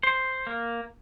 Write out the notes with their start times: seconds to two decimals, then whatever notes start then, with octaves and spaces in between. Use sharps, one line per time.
0.03 C5
0.47 A#3